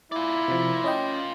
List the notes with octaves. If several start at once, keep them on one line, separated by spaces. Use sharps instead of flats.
E4 F4 D5
C3 F3
C#4 D#5 G5